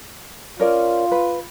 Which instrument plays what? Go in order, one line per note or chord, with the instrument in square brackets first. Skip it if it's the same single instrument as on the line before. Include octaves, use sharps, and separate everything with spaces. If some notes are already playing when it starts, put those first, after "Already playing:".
[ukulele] C#4 A#4 D5 [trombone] F4
[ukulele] B4